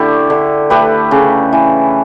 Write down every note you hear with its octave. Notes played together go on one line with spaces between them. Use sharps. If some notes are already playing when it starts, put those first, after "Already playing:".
Already playing: D3 A3 E4 G4
D3
A3 G4 B4
C#3
E3